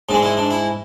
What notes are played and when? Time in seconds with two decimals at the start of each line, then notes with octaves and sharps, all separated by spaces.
0.09 G#2 G#3 D4
0.23 E4
0.37 D4
0.51 E4